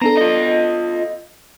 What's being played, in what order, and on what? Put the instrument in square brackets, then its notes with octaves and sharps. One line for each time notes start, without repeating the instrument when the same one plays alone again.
[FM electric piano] B3 D4 A4 [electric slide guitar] A#5
[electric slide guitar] F4 D#5